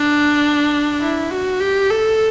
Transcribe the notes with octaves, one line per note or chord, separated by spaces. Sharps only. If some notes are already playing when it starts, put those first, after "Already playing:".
Already playing: D4
E4
F#4
G4
A4